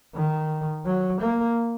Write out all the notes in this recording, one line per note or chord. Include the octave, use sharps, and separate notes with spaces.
D#3
F#3
A#3